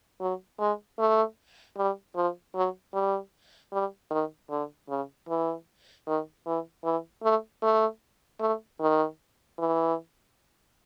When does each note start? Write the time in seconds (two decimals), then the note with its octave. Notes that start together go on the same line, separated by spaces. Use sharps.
0.21 F#3
0.60 G#3
0.99 A3
1.78 G3
2.15 F3
2.55 F#3
2.94 G3
3.72 G3
4.11 D#3
4.50 D3
4.89 C#3
5.29 E3
6.07 D#3
6.46 E3
6.84 E3
7.23 A3
7.62 A3
8.40 A3
8.80 D#3
9.59 E3